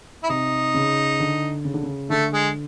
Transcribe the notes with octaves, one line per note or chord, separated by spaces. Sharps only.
E4
C3 D#4
C#3
D3
C#3
D3
C#3
D3 A3
G#3